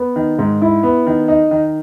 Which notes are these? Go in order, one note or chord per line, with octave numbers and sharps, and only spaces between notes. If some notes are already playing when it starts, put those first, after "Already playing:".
Already playing: B3
D#3
G#2
E4
B3
D#3
D#4
D#3